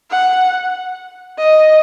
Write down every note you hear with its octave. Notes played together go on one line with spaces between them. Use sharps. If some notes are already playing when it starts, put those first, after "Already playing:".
F#5
D#5